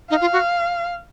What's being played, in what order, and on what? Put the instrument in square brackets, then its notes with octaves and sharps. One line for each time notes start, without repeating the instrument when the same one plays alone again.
[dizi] D#4 [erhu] F5
[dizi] F4
F#4